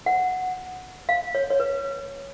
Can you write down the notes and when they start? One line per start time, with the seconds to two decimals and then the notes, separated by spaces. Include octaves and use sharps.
0.06 F#5
1.09 F5
1.35 C#5
1.50 C#5
1.60 B4